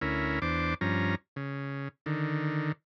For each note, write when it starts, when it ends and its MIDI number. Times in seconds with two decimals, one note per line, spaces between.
0.01 0.39 38
0.01 0.39 61
0.01 0.39 64
0.01 0.39 70
0.42 0.74 40
0.42 0.74 62
0.42 0.74 72
0.42 0.74 86
0.81 1.15 43
0.81 1.15 53
0.81 1.15 61
0.81 1.15 82
1.36 1.88 49
2.06 2.72 50
2.06 2.72 51